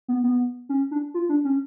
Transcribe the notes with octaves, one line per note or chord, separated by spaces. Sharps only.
B3
B3
C#4
D4
F4
D4
C#4